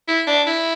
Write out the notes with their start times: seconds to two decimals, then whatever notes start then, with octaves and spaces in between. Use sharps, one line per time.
0.08 E4
0.27 D4
0.47 E4